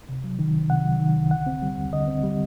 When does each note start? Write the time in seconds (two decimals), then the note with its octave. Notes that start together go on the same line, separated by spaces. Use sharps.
0.09 C3
0.24 F#3
0.39 D#3
0.54 C2
0.70 C3 F#5
0.85 F#3
1.00 D#3
1.16 C2
1.31 D3 F#5
1.46 C4
1.62 G3
1.77 D#2
1.93 D3 D#5
2.07 C4
2.23 G3